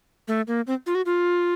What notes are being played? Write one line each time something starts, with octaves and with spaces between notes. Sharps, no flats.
A3
A#3
C4
F4
F#4
F4